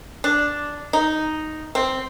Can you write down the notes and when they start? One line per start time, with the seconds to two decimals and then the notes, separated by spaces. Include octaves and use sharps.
0.24 D4
0.93 D#4
1.75 C4